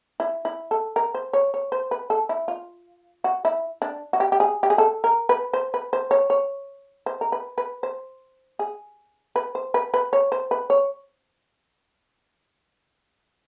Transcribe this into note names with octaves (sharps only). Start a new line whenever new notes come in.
E4
E4
A4
A#4
C5
C#5
C#5
C5
B4
A4
E4
F4
F#4
E4
D4
F#4
G4
G4
G#4
G4
G#4
A4
A#4
B4
C5
B4
C5
C#5
C#5
C5
A#4
B4
B4
C5
G#4
B4
C5
B4
B4
C#5
C5
B4
C#5